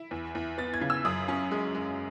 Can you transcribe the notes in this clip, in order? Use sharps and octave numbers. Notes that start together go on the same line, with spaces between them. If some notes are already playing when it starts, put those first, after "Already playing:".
Already playing: E4
E2
E2
B3 A6
G#6
C#3
E6
F#2 D#6
C#4
G#3
G#3